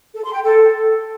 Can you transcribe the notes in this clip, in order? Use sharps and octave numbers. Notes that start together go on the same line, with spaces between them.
A4
C6
G5
A4